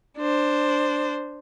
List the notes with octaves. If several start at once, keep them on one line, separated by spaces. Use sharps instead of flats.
D4 C5